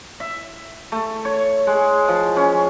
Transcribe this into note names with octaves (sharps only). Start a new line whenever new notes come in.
E5
A3
C#5
G#3
F3
C#4